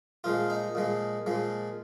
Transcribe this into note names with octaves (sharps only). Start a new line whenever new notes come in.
A#2 F3 G#3 F4
D#4
A#2 F3 G#3
A#2 F3 G#3